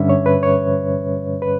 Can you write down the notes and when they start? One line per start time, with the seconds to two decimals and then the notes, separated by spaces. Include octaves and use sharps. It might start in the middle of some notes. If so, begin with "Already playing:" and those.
Already playing: G2 D3 G3 C#4 E5
0.09 C#5
0.26 B4
0.43 C#5
1.42 B4